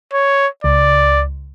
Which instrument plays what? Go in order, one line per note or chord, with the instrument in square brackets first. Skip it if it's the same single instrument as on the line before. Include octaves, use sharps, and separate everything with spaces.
[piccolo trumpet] C#5
[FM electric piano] C#2 [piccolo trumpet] D5